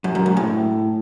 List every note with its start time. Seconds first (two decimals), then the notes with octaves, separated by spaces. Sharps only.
0.04 F#2
0.15 F#2
0.26 G#2
0.37 A2